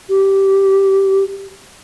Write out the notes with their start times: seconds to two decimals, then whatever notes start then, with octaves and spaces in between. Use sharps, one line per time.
0.09 G4